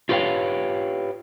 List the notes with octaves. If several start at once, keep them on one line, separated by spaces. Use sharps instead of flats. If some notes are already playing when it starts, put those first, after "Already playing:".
F4 G4 B4 C#5 F5 G5